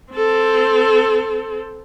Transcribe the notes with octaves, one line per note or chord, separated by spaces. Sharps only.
C4 A4